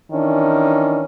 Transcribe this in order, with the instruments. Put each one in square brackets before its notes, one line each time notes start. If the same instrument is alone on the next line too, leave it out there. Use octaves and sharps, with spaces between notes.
[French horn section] D#3 E3 C#4 D4